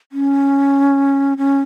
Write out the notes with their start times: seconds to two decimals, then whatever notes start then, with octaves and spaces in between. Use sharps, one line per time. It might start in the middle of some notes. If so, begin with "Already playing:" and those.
0.12 C#4
1.38 C#4